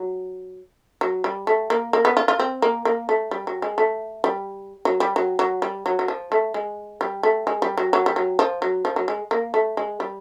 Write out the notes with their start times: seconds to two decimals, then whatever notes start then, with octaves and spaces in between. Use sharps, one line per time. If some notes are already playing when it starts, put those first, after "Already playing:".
Already playing: F#3
1.01 F#3
1.24 G3
1.47 A3
1.70 A#3
1.93 A#3
2.05 B3
2.17 F4
2.28 F4
2.39 C4
2.62 A#3
2.85 A#3
3.09 A3
3.31 G3
3.47 F#3
3.62 G#3
3.78 A3
4.24 G3
4.85 F#3
5.00 G3
5.16 F#3
5.39 F#3
5.62 G3
5.86 F#3
5.99 F#3
6.08 F3
6.32 A3
6.54 G#3
7.01 G3
7.23 A3
7.47 G#3
7.62 G3
7.77 F#3
7.93 F#3
8.06 G3
8.16 F#3
8.39 F3
8.62 F#3
8.85 F3
8.96 F#3
9.08 G#3
9.31 A#3
9.54 A3
9.77 G#3
10.00 G3